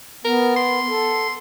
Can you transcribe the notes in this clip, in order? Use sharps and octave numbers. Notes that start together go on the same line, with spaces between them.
B3 A#4
C6
A4